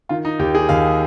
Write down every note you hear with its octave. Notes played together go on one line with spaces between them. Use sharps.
D#3 F4
D#4
D#2 G4
G#4
D#2 F5